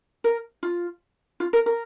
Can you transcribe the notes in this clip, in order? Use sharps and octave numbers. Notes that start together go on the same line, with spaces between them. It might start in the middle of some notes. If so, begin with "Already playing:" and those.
A#4
F4
F4
A#4
A#4